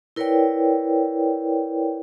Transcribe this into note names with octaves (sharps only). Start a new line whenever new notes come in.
E4 A#4 B4 C#5 D5 G5